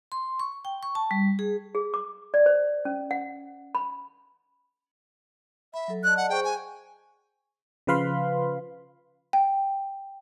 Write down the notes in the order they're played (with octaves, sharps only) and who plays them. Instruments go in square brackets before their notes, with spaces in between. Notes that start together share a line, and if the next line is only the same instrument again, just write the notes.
[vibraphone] C6
C#6
G5
C#6
A5
G3
G#4
[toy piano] G#4
D6
D5
C5
C#4
F#5
B5
[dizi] E5 [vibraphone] B5
[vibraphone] F#3 A4
[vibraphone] D5 D#5 A5 [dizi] F#6
[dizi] F#5
[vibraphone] G#4 C5 C#6 [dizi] G5
[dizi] G#5
[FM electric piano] C#3 F3 B4 F5 B5 C6
[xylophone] G5